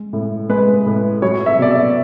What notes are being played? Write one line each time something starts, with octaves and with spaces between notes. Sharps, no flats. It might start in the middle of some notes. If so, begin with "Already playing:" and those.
Already playing: G#3
A2
G#3 B4
A2
F#3 C#5
E5
B2 D5
E5